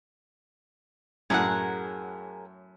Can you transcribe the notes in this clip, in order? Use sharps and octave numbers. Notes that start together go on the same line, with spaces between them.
F#2 A2 F#3 G#4 A#4 F#5